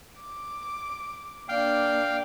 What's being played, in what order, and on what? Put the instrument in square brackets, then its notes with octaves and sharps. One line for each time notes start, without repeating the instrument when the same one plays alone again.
[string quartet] D6
[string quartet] A#3 D4 [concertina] F5 G5